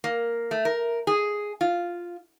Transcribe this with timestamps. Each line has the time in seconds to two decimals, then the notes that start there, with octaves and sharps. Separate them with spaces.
0.04 A#3
0.51 A3
0.65 A#4
1.07 G#4
1.61 F4